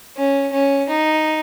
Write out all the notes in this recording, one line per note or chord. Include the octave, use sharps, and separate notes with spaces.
C#4
C#4
D#4